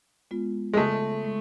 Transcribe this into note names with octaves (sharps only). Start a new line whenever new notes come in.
G#3 B3 F4
G#3
C#3 A3
G#3